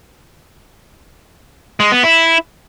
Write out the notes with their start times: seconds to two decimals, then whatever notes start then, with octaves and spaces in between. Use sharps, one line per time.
1.80 G#3
1.92 B3
2.03 E4